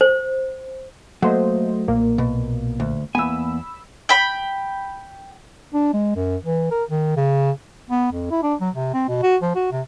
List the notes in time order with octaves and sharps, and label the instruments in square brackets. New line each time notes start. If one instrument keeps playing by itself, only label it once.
[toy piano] C5
[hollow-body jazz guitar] F#3 [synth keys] A3 C5 D#5 [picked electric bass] A#3
[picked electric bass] B1 A#2 [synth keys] A#3
[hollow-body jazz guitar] B2
D2
[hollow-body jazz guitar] E2 G#5 [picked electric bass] A#3 B3 [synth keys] B5 E6
[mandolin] G5 B5
[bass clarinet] D4
G#3
F#2
E3
A#4
D#3
C#3
B3
F2
E4
D4
F#3
C3
C4
B2
F#4
F3
F#4
C3